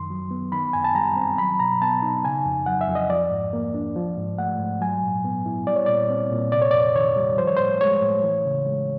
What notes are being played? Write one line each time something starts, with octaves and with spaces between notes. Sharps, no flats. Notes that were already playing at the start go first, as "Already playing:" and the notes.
Already playing: F#2 D#3 C6
F#3
B3
D#3 B5
F#2 G#5
A5
G3 A#5
C4
F#3 B5
B2 A#5
B3 A5
D#4
C#3 G#5
F2
F#3 F#5
E5
F2
D#5
F3 D5
G#2
A#3
D4
F3
G#2
A3 F#5
G#2
F#3 G#5
A#2
B3
E4
G3 D5
C#5
A#2 D5
C4
A#2
C3 D5
C#5
F2 D5
D#3 C#5
G3
F3 C5
C#5
A2 C5
G#3 C#5
A2
E3
C#3
G#3